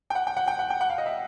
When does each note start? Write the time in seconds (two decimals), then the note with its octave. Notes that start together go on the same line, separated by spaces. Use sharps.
0.10 G5
0.15 F#5
0.27 G5
0.37 F#5
0.48 G5
0.59 F#5
0.70 G5
0.81 F#5
0.90 F5
0.98 D#5
1.06 E5